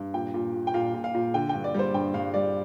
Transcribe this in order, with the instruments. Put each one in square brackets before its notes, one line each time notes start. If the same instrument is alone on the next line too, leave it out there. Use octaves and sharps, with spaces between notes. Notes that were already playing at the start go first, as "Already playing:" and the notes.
Already playing: [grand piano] G2
A#2 G5
A#2
A#2
G5
A#2 F5
A#2
F5
A#2
D3 G5
G5
G2
D5
G3 C5
G2 G5
G2 F5
G3 D5